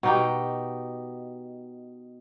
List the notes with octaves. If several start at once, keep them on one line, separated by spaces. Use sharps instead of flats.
B2 D#4 G4